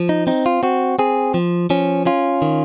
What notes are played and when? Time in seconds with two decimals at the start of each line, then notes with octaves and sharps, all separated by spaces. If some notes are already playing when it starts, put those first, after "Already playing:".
Already playing: F3
0.09 D#4
0.27 C4 D#4
0.46 F4
0.63 C4 F#4
0.99 C4 G#4
1.34 F3
1.70 F3 C#4
2.06 C#4 F4
2.42 D#3